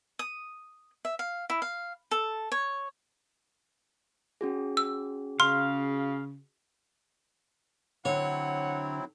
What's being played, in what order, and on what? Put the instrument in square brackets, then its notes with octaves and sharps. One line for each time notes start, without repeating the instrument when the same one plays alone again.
[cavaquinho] D#6
E5
F5
E4
F5
A4
C#5
[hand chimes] C#4 F#4 G#4
[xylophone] E6
[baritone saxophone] C#3 [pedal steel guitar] F5 [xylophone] C6
[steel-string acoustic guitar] D3 [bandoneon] F#3 C4 E4 [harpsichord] C#5 [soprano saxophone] F#5